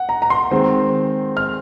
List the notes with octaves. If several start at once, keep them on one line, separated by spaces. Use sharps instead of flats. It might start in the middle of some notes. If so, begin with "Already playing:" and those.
Already playing: F#5
A#5
A#5
C6
D#3 G#3 C4
F6